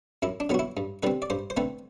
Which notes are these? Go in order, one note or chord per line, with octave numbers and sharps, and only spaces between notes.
F#2 E4
D4
D3 F#3 B3 F#4
E4
G2
D3 G3 C4 B4
D5
G2 C5
C5
D3 A3 C4 B4